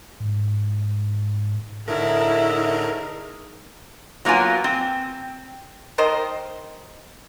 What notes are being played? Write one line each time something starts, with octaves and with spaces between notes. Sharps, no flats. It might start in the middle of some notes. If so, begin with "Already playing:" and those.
G#2
A2 D3 A3 D#4 E4 G#4 A#4
F#3 A#3 B3 F4 G#5
C4
D#3 A#4 C5 D#5